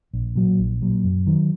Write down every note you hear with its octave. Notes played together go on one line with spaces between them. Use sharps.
A#1
A#2 F#3
A#1
A#2 F#3
F#2
D#3 F#3